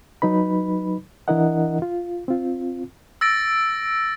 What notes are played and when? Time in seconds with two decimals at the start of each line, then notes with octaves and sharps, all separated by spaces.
0.22 F#3 D#4 B4 B5
1.28 E3 D4 E4 A#4 D#5 F#5
1.82 F4
2.28 C4 F4
3.21 E6 A6 A#6 D7